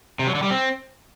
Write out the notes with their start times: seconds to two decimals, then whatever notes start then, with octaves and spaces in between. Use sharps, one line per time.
0.19 C3
0.27 F#3
0.35 D3
0.43 G3
0.51 C4